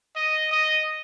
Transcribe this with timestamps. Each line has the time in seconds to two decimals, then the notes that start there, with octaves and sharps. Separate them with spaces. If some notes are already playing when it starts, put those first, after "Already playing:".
0.16 D#5
0.52 D#5